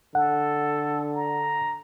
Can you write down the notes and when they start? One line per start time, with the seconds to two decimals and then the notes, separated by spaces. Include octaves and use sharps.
0.15 D3 A4 F#5
1.15 A#5